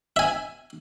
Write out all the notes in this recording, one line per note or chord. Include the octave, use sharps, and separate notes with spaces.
E5 G#5